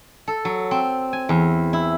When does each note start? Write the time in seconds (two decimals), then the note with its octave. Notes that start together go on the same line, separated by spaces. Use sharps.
0.28 A4
0.45 F#3
0.71 C4
1.13 G#5
1.29 E2
1.73 E4